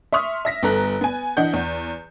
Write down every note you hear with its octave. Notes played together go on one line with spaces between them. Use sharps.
E5 C6 C#6 D#6 F6
E5 A#6 B6
G1 B3 A4 A#5 F#6
B3 G#5
E3 D4 D#5 F#5 G6
E2